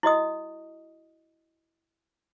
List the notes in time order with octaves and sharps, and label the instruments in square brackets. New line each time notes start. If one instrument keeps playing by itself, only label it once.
[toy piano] E4 F#4 D#5 D#6